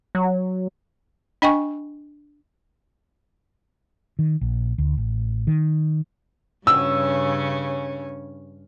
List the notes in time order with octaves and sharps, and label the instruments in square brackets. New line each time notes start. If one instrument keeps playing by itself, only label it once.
[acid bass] F#3
[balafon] D4 D#5 G5 G#5 C#6
[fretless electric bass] D#3
A#1
D2
A1
D#3
[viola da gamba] G2 C#3 C#4 [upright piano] E6